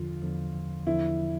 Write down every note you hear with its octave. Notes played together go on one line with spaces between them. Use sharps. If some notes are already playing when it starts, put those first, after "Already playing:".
Already playing: E2 D3 F3 F4
E2 D3 F3
E2 D3 F3 E4